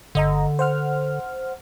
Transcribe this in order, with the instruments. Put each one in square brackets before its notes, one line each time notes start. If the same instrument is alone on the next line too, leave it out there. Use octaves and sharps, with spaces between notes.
[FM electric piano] G1 D#5 A#5 [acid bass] D3
[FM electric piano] C5 F#5 F6